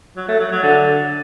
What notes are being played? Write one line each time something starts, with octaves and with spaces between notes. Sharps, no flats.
F#3
A3
F#3
F#3
D3